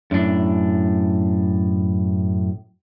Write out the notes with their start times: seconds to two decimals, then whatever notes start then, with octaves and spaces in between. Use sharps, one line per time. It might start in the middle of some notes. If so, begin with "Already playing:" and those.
0.11 F#2 A2 D4